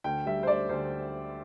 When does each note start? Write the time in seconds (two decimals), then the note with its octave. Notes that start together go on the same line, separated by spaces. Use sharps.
0.04 D2 G5
0.26 G3 E5
0.43 C5
0.47 D2 D5
0.69 D2 C5